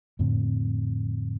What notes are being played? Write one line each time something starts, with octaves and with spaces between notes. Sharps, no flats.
F2 A2 D3 C4